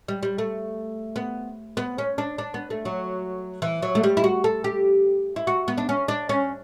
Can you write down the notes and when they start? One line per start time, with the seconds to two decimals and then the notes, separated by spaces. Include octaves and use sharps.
0.08 G3
0.23 G3
0.38 A3
1.16 B3
1.77 B3
1.98 C#4
2.18 D4
2.38 D4
2.54 B3
2.70 A3
2.85 F#3
3.62 E3
3.82 F#3
3.95 A3
4.04 G3
4.17 E4
4.24 F#4
4.44 A4
4.64 G4
5.36 E4
5.47 F#4
5.68 B3
5.78 D4
5.89 C#4
6.08 D4
6.29 C#4